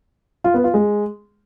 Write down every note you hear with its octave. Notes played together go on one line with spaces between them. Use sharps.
F4
B3
F4
G#3